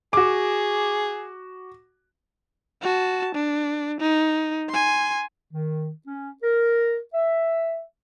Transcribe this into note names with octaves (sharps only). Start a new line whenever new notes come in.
F#4 G#4 D6
F#4 A5
D4
D#4
G#5 C6
D#3
C#4
A#4
E5